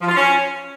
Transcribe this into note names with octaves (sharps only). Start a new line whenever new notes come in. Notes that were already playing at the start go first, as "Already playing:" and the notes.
F3
F4
C#4